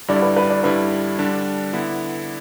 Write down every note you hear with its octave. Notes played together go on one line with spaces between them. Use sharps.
G2 D3 G3 E4 D5
B4
B4
D5
G2 D3 G3 E4 B4
D3 G3 D4
D3 B3 E4